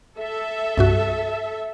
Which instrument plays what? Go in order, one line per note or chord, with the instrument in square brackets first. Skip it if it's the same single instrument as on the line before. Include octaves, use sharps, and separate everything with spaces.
[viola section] A4 E5
[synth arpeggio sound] C2 G2 F#4